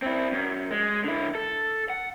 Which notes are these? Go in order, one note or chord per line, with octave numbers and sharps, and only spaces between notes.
C4 E4
F#2
G#3
D3 E4
A4
F#5